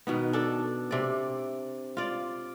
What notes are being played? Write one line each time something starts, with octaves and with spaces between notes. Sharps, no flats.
B2 D#3 B3
D4 A4
C3 D5
F4 D5